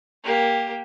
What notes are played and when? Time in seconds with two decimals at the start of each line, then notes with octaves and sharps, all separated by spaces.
0.24 A#3 G4